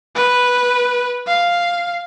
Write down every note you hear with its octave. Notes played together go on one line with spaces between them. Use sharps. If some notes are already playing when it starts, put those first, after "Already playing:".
B4
F5